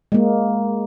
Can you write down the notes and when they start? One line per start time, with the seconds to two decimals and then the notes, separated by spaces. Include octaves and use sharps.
0.12 G#3 A#3